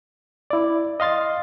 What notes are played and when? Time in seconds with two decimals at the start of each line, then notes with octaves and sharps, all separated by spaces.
0.50 E4 D5
1.00 D#5 F5 C6 A6